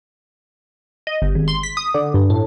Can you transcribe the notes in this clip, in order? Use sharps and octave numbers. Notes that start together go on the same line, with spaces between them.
D#5
G1
G#1
C6
B6
D#6
D3
G2
A2